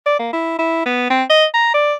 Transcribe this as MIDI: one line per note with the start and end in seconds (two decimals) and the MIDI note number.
0.06 0.18 74
0.19 0.29 58
0.33 0.55 64
0.59 0.82 64
0.85 1.10 59
1.10 1.23 60
1.30 1.45 75
1.54 1.71 82
1.74 1.94 74